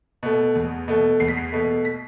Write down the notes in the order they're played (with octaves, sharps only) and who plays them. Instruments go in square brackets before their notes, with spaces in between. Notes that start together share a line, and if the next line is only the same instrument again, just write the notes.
[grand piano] B2 A3
E2
B2 A3
E2 C7
B6
C7
B2 A3
B6